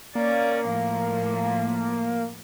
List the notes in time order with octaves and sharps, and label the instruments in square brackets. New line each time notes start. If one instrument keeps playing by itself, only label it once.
[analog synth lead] A#3 [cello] C#4 D5
[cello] A2 F3